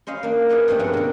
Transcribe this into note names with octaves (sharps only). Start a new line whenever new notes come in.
C#4 C5 D#5 F5 B5
A#3 D4
G#4 B4 D#5 F#5
G2 F3 A3 C4 D4
B3 C#4 A#4 F#5
B2 D3